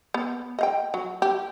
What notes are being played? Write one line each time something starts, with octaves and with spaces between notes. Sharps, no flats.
B3
D#5 F5 G5
F#3
G4